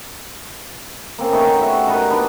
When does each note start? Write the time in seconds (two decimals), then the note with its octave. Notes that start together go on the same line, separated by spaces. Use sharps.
1.18 A#3 C4 C#4
1.32 A3 B3 D#4
1.59 F#4 G4 E5
1.87 D#4 A#4 B4 D5
2.10 B3 D4